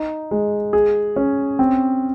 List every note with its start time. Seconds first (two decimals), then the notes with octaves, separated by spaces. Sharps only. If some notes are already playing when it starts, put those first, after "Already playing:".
Already playing: D#4
0.31 G#3
0.73 G#4
1.16 C#4
1.59 C4